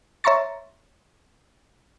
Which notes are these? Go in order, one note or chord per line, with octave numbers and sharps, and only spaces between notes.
C#5 E5 A#5 C6 C#6 A6